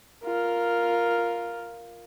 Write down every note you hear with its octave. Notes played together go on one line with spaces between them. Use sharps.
F4 A#4